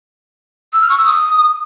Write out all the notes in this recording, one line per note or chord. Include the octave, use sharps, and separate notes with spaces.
E6
F6
C#6
E6
D#6